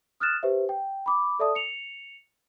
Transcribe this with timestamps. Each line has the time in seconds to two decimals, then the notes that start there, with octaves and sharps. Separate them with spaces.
0.20 D#6 F6 F#6 A6 E7
0.43 G4 B4 C5 E5
0.69 G5
1.06 B5 D6
1.39 A4 D5 E5 A5 D#6
1.55 C#7 F7